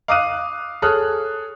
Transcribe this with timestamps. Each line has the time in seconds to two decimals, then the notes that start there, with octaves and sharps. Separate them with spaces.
0.08 F5 D6 D#6 F6 F#6 D#7
0.82 G#4 A4 C#5 D#6 F6 F#6